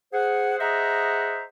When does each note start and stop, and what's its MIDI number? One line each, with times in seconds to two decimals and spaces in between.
0.13 0.55 68
0.13 0.55 72
0.13 0.55 78
0.60 1.43 68
0.60 1.43 72
0.60 1.43 75
0.60 1.43 76
0.60 1.43 78
0.60 1.43 82